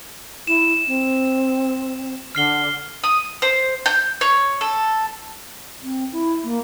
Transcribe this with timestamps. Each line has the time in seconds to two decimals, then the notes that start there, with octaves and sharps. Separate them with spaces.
0.47 E4 E7
0.87 C4
2.35 D3 F6 C7 G7
3.04 D#6
3.42 C5
3.86 G6
4.21 C#5
4.61 A4
5.81 C4
6.12 E4
6.43 A#3